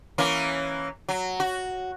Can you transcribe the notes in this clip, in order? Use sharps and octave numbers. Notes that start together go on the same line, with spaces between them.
E3 A#3 C#4
F#3
F#4